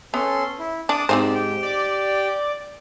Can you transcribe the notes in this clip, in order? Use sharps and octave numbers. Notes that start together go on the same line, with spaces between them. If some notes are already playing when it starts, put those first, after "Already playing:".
B3 C#4 A4 C6
E4
D4 A5 D6 D#6
G#2 C4 D#4 G4 C5 D5
G4 G5
D5